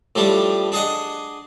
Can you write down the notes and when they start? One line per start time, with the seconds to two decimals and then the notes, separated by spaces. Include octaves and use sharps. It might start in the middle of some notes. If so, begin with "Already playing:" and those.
0.15 A2 F3 G3 D4
0.72 D4 G#4 D#5 F#5